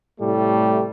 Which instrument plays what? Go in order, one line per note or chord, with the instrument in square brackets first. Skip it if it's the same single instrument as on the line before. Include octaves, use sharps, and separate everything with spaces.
[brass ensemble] A2 C3 G3 A3